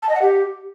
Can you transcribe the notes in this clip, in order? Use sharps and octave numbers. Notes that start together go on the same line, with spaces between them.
A5
D#5
F#5
G4